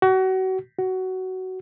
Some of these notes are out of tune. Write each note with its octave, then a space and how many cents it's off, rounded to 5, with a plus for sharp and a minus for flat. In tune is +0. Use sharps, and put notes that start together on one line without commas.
F#4 +30
F#4 +15